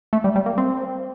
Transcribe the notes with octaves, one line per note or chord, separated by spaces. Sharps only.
A3
G3
G3
A#3
C4